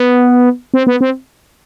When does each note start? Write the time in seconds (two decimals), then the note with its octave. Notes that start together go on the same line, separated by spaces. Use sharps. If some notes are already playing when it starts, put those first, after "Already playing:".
Already playing: B3
0.74 C4
0.87 B3
1.01 C4